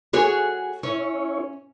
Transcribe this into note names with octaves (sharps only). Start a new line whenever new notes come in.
F#4 G#4 C#5
C#4 E4 C#5